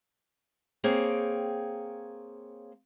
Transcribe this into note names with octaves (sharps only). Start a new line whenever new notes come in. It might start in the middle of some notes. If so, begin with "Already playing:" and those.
A#3 C4 G#4 C#5 G5